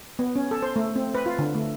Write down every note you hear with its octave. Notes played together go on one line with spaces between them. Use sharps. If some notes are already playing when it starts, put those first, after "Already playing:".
B3
C#4
A4
C5
A3
C4
B4
F4
D3
A3